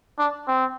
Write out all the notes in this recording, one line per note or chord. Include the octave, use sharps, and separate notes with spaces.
D4
C4